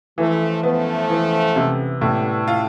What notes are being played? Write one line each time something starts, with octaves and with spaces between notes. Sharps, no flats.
E3 F3 A3
F3 A3 B3
E3
C3
A2 G3 B3
F4